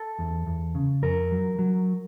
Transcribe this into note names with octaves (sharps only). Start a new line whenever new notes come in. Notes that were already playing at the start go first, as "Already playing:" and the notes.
Already playing: A4
E2
E2
C#3
F2 A#4
F#3
F#3